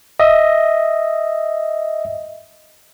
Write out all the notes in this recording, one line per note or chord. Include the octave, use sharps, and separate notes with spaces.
D#5 E5